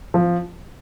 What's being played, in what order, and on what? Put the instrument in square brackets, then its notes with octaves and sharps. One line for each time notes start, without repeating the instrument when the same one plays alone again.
[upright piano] F3